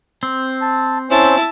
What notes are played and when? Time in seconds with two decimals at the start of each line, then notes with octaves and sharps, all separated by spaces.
0.23 C4
0.62 A5
1.10 C#4 E4 C5 A5